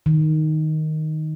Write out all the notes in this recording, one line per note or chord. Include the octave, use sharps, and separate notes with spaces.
D#3